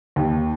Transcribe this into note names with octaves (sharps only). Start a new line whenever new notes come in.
D#2